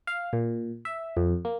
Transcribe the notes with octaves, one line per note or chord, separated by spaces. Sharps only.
F5
A#2
E5
F2
A#3